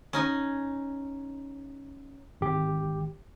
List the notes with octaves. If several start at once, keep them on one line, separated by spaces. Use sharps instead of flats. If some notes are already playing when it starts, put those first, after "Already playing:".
C#4 D#4 G#5
G#1 G4